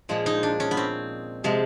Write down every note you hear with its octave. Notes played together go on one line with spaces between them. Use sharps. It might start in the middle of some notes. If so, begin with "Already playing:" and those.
A#2 F3 G#3
D#4
D4
C#4
B3
C4
C3 F3 G#3